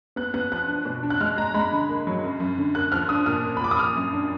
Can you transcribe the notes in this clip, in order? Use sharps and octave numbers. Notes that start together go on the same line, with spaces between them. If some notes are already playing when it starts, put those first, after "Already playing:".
B3 F#6
B3 F#6
F3 F#6
D4
B2
D4
F#6
G#3 F6
G#3 A#5
G#3 B5
D3
A#3
F#3
F#2
F#2
D3
A#3 F#6
F3 F6
D4 D#6
A#2 F6
A#3
B5
A#2 D6
D#6
A#3 F6
F#2
D4